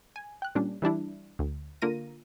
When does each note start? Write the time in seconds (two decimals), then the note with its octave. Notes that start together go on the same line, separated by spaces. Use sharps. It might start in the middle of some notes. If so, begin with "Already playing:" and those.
0.16 G#5
0.42 G5 F#6
0.55 A#2 G3 C#4 D4
0.82 E3 G3 D4 E4
1.39 D2
1.82 D3 A#3 F4 A#4 A#6 D#7